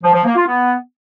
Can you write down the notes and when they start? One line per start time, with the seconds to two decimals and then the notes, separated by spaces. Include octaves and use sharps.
0.03 F3
0.14 F3
0.25 A#3
0.36 F4
0.47 B3